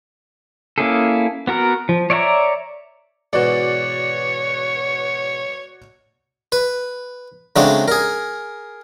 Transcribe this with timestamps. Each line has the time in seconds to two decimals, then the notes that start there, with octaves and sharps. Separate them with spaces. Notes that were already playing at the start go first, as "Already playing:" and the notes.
0.78 A#3 C#4 E4 G#4 A4
1.47 B3 F#4 A#4
1.89 F3
2.10 C#5 D5 E5 F#5 A#5
3.33 G#2 B2 E3 F#4 C#5 D5
6.52 B4
7.56 C#3 F#3 G#3 A3 C4 D4
7.88 G#4 A#4